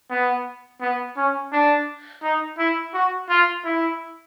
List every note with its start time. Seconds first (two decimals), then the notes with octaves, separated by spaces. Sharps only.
0.10 B3
0.82 B3
1.17 C#4
1.52 D4
2.23 D#4
2.58 E4
2.94 F#4
3.29 F4
3.65 E4